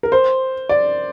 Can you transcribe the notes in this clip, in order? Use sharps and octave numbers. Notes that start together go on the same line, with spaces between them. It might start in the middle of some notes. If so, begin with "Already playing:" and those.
A#4
C5
D5